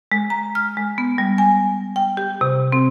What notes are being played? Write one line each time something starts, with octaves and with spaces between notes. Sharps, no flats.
G#3
A#5
F6
G#3
B3
G3
G#5
G5
G4
C3
C4